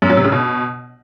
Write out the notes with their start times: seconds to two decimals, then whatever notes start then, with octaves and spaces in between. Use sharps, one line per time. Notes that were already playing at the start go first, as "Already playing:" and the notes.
0.02 F#2
0.10 F#3
0.17 C3
0.25 C#3
0.32 B2